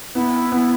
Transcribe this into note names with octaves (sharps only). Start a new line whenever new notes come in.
B3 E4
B3